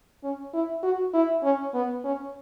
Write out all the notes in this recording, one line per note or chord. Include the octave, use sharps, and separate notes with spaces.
C#4
E4
F#4
E4
C#4
B3
C#4